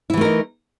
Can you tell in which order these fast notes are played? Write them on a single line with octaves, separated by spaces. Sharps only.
E4 E3 A3 A#4 D#4